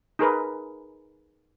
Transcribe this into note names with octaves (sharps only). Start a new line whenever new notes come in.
D#4 G#4 A#4 B4